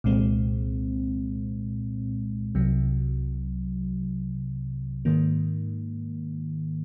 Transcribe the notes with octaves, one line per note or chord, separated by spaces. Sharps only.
C2 A#2 G#3 C4
C2 C3 F#3
G#2 D#3 A#3